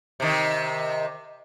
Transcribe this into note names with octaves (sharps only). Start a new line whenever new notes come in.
C3 D#3